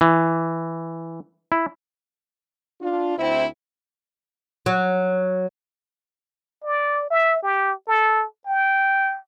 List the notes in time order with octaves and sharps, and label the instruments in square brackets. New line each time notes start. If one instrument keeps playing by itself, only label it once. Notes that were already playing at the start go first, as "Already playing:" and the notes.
[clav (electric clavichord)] E3
E4
[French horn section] D4 F4
D2 C4 E4
[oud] F#3
[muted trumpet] D5
E5
G4
A4
G5